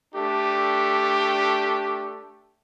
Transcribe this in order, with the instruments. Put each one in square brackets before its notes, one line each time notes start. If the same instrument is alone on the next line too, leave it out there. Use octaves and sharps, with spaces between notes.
[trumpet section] A3 D4 G4